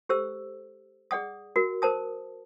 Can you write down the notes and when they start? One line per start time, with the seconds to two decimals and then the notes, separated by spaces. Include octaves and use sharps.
0.09 G4 A4 C5 E6
1.11 G#4 D5 F#5 D#6
1.56 F#4 A#4
1.82 A#4 C5 A5 D#6